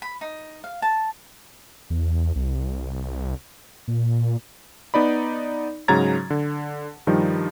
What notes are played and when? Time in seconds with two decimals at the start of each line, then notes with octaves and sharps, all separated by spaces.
0.02 B5
0.21 D#4
0.64 F5
0.82 A5
1.90 E2
2.36 C2
3.88 A#2
4.94 B3 D#4 D5 B5
5.88 G#2 C#3 F#3 A#5 G#6 A6
6.30 D3
7.07 G2 D#3 F3 G3 D#4